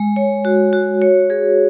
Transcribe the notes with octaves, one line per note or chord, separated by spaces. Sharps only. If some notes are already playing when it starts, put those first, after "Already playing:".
Already playing: G#3
C#5
F#4
F#4
C#5
G#4